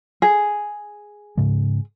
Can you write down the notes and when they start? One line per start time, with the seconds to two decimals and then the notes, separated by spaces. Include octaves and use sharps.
0.22 G#4
1.37 G#2 C#3 G#3